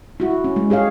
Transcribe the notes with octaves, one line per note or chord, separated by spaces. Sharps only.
E4 F#4
C#4
G#3
G4 G#4 C#5 F5